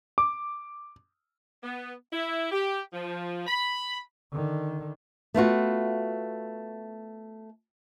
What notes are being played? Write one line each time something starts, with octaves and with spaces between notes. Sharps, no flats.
D6
B3
E4
G4
F3
B5
D3 D#3
A3 B3 F4 F#4